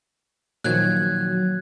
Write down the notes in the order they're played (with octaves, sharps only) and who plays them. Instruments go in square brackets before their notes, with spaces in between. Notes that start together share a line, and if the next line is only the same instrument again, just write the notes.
[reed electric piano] A#2 D#3 F3 [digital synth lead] F#3 [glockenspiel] F#6 G#6